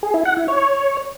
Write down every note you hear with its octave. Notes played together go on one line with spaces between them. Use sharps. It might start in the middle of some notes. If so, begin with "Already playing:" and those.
G#4
E4
F#5
E4
C#5